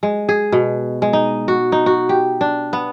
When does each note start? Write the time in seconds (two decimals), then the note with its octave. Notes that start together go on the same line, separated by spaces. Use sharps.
0.03 G#3
0.29 G#4
0.52 B2
1.02 G#3
1.13 D#4
1.48 F#4
1.72 D#4
1.86 F#4
2.09 G4
2.41 D4
2.73 B3